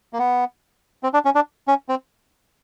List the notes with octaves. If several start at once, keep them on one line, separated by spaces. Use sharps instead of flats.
A#3
B3
C4
D4
C#4
D4
C#4
C4